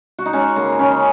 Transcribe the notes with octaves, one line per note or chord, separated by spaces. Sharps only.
F#4
D#4
G#3 C#4
C#3 A#3
C#3 C#4